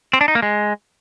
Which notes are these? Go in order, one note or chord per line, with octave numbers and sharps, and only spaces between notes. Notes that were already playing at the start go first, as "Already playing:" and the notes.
C4
D4
D#4
A#3
G#3